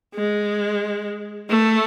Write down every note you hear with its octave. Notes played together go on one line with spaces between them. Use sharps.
G#3
A3